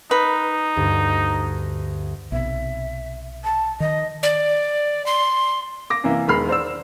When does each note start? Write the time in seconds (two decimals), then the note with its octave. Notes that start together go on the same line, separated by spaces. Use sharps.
0.11 D#4 B4
0.76 D2 G2
2.32 B1 C3 E5
3.44 A5
3.80 D#3 D#5
4.23 D5
5.06 C6
5.90 D6 A#6
6.04 F#2 C3 E3 A#3
6.27 E1 D#3 G#3 B5 F6 C7
6.49 C5 D5 E6